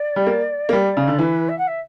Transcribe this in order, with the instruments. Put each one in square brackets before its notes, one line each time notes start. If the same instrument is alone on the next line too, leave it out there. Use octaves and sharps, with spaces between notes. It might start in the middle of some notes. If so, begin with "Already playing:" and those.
Already playing: [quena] D5
[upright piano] G3
A#3
A#3
G3
C#3
D3
[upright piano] E3 [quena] B4
[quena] E5
F#5
E5